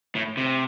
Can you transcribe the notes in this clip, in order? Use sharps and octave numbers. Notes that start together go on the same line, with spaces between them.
A2
C3